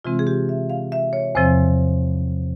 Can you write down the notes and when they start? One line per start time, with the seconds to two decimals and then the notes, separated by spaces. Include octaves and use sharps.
0.05 C3 E3 G#3 C4 F4
0.19 G#4
0.27 G4
0.49 E5
0.70 F5
0.92 E5
1.13 C#5
1.35 E2 C3 F3 C4 C5